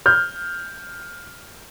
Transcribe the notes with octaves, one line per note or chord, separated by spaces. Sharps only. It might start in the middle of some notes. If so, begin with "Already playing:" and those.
F6 G6